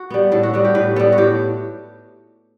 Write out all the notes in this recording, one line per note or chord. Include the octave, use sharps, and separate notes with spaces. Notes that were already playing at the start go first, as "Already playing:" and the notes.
Already playing: F#4
G3 B3
A2 A4
F#4
G3 B3 F#4
G4
A2 B4
G3 B3 A4
F#4
A2 G4